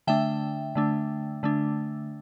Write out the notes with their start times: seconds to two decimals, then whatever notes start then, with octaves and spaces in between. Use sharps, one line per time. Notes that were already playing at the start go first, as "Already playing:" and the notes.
0.07 D3 A3 D4 E5 G5
0.75 D3 A3 D4
1.43 D3 A3 D4